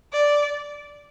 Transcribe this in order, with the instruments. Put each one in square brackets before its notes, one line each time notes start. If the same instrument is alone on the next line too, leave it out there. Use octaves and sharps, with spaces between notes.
[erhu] D5